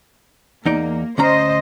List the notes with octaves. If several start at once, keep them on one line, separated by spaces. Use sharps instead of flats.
E2 A#3 D#4 D5
D2 C#4 C5 D#5 A#5